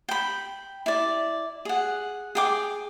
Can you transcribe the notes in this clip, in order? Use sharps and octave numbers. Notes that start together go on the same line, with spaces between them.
G5 B5
E4 D5
G#4 F#5
G#4 G5 D6